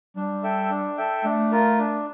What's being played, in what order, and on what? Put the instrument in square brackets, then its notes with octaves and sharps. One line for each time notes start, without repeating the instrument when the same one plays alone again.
[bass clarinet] G3 [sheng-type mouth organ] D4
[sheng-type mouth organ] A4 E5 G5
D4
A4 E5 G5
[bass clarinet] A3 [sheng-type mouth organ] D4
[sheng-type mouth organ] F4 A#4
D4